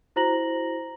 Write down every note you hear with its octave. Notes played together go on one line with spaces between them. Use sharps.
E4 F#4 C5 A#5 A#6 F#7